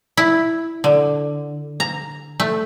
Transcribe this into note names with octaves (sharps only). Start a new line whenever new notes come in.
E4
D3
A#5
A3